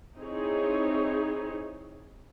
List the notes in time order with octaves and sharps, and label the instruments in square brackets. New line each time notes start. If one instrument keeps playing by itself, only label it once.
[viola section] C4 D#4 E4 G#4 C#5